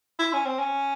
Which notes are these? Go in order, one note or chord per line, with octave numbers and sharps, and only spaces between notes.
E4
C#4
C4
C#4